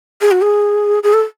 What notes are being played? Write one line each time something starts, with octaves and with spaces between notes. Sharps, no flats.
G#4
F#4
G#4
G#4
A4